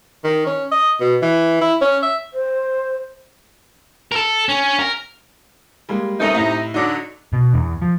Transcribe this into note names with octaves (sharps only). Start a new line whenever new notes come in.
D#3
C#4
D#5
B2
E3
E4
C#4
E5
C5
A4 A#4
C#4
A#4
G3 G#3 A#3
C3 A3 C#4 D#4 A#4
A2 E4
D3 F#3 D#4 D6 A#6
B2
E2
F3